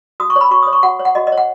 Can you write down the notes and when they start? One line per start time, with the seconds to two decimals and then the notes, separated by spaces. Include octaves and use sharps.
0.20 F#4 D#6
0.30 C#6
0.36 C#5
0.41 B5
0.51 F#4 C#6
0.63 C#5 D#6
0.73 C#6
0.83 F#4 F#5
0.99 C#5
1.05 F#5
1.15 F#4 D#5
1.27 D#5
1.32 C#5
1.38 F#5